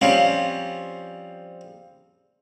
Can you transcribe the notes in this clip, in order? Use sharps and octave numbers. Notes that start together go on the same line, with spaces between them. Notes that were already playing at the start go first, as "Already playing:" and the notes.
F3 G3 C4 C#4 F4